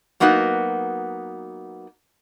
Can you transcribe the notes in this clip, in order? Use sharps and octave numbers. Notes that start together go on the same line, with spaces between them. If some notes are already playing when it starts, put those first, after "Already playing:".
F#3 A#3 B3 D#4 F#4